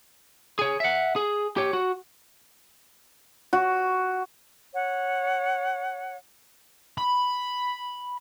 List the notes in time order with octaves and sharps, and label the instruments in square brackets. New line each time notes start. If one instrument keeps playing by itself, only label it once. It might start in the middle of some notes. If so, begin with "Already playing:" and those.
[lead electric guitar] G#4 C#5
E5 F#5
G#4
G4 C#5
F#4
[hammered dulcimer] F#4
[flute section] C#5 F#5
[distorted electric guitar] B5